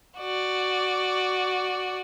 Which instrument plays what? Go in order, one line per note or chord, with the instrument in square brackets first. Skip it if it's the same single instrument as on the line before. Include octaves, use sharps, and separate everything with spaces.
[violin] F#4 D5